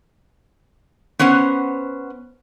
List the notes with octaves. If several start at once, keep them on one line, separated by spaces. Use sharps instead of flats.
B3 C#4 C5 F#5